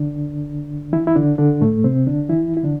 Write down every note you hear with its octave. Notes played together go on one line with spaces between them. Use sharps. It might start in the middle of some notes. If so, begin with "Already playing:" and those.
Already playing: D3 D4
E3 E4
E4
D3 D4
D3 D4
A2 A3
C3 C4
D3 D4
E3 E4
E4
D3 D4